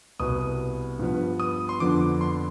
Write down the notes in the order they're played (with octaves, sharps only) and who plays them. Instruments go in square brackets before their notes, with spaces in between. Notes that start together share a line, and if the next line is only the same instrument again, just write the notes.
[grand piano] C2 B2 B3 D#6
G2 F3 B3
D#6
C6
F2 D3 F3 B3 D6
C6